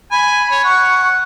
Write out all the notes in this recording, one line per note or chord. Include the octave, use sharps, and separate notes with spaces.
G#5 B5
C#5
F#5 C#6